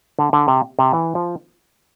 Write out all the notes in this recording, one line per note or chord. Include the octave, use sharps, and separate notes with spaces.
D3
D3
C3
C3
E3
F3